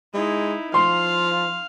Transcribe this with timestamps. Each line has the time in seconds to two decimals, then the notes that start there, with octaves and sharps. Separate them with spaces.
0.14 G#3 D#4 E4
0.74 F3 F5 C6